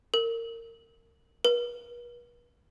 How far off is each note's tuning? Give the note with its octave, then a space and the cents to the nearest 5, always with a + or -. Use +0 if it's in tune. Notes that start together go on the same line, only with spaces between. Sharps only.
A#4 -25
B4 -45